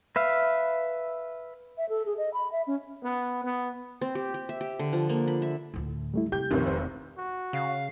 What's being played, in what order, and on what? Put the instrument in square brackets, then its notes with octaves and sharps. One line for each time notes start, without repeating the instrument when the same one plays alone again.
[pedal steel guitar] B4 E5 F5
[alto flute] E5
A4
G#4
D#5
B5
E5
C#4
[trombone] B3
B3
[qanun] C4
G4
G4
E5
G4
D3
F3
A#3
B5
E5
[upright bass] D2 A2
[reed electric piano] G3 A3 E4
[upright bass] C3 [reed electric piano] G4 [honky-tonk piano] G6
[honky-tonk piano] F1 C3 D#3 [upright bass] A#1 E2
[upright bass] E1 [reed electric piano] C5
[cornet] F#4
[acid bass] C#3 [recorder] F5